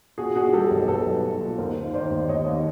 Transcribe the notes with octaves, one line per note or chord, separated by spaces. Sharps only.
A#2 F#4 G#4
A#2 F#4 G#4
G3 G4 A4
B1
B1 A4 B4
B1
B1
A#2
D#2 A#4 C5
D#3
D#3 C5 D5
D#2
D#2 C#5 D#5
D#2